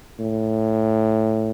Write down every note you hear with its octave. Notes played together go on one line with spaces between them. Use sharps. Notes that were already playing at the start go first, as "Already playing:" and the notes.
A2